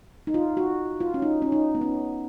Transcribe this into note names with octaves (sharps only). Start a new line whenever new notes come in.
D#4
F4
F#4
F4
C#4
D#4
C#4
D#4
B3
C#4